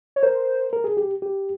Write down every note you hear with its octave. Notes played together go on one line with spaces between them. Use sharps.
C#5
A#4 C5
A#4
G#4
G4
G4